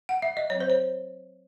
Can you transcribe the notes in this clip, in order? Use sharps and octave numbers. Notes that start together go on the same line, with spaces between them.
F#5
E5
D#5
F#3 C4 C#5
C5
C#5